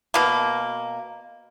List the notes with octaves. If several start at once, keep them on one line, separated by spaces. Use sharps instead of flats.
B2 A#3